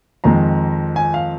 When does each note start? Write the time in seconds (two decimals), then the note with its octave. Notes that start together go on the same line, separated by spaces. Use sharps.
0.24 F2 D#3 G#3 A#5
0.96 G#5
1.14 F5